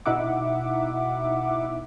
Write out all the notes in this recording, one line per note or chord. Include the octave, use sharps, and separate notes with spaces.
B2 D#4 E4 E5 F#5 D6